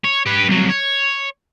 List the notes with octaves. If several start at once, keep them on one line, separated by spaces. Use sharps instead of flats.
C#5
G4 B4
C2 F#3
C#5